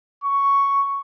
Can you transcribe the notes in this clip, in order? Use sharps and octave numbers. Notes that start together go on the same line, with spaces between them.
C#6